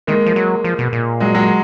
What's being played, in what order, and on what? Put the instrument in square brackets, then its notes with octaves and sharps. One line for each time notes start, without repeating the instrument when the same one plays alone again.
[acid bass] D#3 [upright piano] G#3 A#3
[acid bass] F3
F#3
F3
B2
A#2
[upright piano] F#3 G#3
F#3 G#3